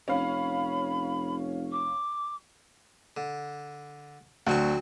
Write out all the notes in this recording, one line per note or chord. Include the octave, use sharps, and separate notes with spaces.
F1 C#4 F5 B5
D6
D3
D2 F#3 C4 C#6